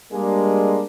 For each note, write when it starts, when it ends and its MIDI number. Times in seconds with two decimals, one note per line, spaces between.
0.12 0.84 55
0.12 0.84 56
0.12 0.84 58
0.12 0.84 62